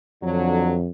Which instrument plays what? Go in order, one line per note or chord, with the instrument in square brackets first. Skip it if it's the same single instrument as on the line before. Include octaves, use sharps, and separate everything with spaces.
[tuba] F2 [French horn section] D3 F#3